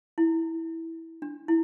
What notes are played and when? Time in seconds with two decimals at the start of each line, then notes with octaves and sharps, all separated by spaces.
0.18 E4
1.22 D4
1.48 E4